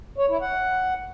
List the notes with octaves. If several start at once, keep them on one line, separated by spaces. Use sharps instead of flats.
C#5
E4
F#5